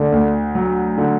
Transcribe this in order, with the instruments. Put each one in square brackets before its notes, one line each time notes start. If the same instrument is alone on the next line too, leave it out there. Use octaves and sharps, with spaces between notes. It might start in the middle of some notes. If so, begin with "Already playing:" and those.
Already playing: [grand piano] D2 [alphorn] D3
[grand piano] D2
F#3
D3